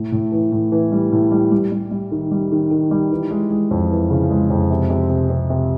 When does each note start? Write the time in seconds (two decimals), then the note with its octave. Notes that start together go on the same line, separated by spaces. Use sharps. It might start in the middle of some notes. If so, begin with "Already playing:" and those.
Already playing: A2
0.12 A2
0.32 E3
0.52 A2
0.72 E3
0.92 G3
1.12 A2
1.32 G3
1.52 G3
1.72 G3
1.91 G3
2.11 D#3
2.32 G3
2.52 D#3
2.71 D#3
2.91 G3
3.11 E3
3.31 G#3
3.50 G#3
3.71 F2
3.91 E3
4.10 C#3
4.30 G#3
4.50 F2
4.70 C3
4.90 C3
5.10 C3
5.30 C3
5.50 C3